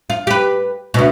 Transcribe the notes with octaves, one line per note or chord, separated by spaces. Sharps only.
F4
G4 B4
D2 B2